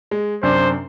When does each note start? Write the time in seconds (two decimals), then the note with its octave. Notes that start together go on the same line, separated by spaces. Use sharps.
0.11 G#3
0.43 F#2 C3 D4 C5